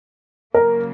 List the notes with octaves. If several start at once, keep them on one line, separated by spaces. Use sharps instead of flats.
C#3 F#3 A#3 A#4